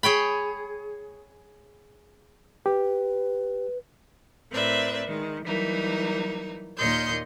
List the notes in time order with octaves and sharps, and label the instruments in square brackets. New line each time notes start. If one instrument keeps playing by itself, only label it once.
[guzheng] G#4 C#5 G5 B5
[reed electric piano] G4 [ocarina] B4
[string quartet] A2 C4 A#4 B4 D5 E5
D#3 G#3
E3 F#3 G3 A#3 D#4
D#2 A#2 C#5 D#5 C6 G6